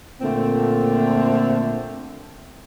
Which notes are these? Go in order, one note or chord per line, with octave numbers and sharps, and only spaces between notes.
A#2 D3 A3 C4